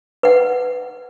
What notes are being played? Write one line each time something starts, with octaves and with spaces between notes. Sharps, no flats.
B4 F#5